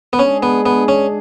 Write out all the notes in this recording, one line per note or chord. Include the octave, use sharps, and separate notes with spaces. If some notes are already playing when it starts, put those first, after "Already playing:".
B3
G#3 C#4 D4 G#4
B3
B3
C#4